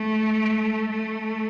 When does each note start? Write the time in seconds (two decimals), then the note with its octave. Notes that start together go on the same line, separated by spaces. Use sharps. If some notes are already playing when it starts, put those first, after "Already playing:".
Already playing: A3
0.91 A3